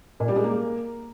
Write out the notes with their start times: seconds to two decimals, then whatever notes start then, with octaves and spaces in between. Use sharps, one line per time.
0.20 A#2
0.28 G3
0.36 G#3
0.44 A#3